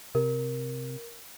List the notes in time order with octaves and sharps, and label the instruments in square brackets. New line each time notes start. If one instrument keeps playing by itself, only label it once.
[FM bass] C3 [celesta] A#4